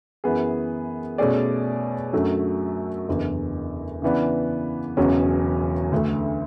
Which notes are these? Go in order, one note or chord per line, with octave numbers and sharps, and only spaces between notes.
F#2 E3 B3 E4 G#4
B2 A3 C#4 G#4 D5
F#2 D3 F#3 A3
F#1 E2 D3
C#3 E3 B3 D4
E1 E2 C#3 F#3 C#4
D2 D3 A3